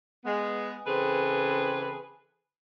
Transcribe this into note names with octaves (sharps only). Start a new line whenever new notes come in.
G#3 B3
C#3 E3 C4 G#4 A4 B4